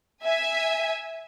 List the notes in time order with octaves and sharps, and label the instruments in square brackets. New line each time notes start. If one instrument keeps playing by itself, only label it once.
[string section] E5 G#5